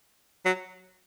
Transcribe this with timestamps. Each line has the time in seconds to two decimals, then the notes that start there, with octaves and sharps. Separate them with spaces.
0.45 F#3